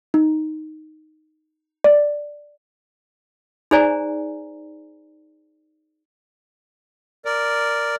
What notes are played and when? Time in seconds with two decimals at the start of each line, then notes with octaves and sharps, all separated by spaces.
0.14 D#4
1.84 D5
3.71 D#4 G#4 C5 D5 G#5 A#5
7.25 A#4 D5